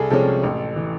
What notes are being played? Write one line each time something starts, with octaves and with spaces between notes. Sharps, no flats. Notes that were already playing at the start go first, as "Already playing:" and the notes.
Already playing: C2 G#4 A4
C3 F3 G#3 C#4 A4
A1
E3